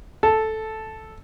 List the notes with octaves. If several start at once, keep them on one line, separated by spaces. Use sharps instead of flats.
A4